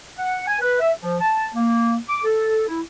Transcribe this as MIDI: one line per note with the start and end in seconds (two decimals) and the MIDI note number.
0.18 0.47 78
0.48 0.59 80
0.60 0.79 71
0.80 0.93 76
1.00 1.17 53
1.21 1.48 81
1.55 1.97 58
2.08 2.24 86
2.24 2.65 69
2.68 2.80 64